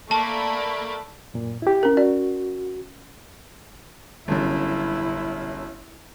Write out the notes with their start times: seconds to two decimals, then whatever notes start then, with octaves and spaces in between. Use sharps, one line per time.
0.11 A3 A#3 D5 A5 B5
1.34 F#2 A#2
1.62 E4 G4
1.83 C#4 A#4
1.97 F#4 D5
4.28 G1 F#2 E4